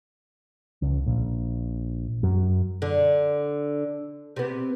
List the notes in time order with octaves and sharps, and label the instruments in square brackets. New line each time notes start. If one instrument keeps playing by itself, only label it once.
[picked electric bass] C#2
A#1
F#2
[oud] D3
C3 B3